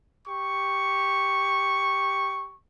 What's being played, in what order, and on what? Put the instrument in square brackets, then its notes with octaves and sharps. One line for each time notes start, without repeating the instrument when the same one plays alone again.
[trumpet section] G4 C#6